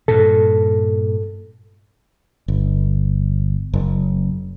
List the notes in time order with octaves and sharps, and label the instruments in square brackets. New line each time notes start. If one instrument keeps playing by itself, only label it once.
[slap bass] G2 A#2 [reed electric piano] A4
[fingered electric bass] G1
F#1